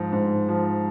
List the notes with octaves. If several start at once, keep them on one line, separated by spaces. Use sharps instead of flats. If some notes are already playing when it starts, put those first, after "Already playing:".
Already playing: G#2 F3
G#2
F3